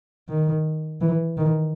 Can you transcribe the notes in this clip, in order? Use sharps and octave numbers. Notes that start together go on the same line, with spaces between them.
D#3
E3
D#3